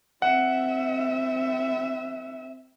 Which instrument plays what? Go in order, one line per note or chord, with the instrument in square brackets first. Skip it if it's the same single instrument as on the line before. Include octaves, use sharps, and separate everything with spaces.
[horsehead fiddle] C4 E5 [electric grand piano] F#5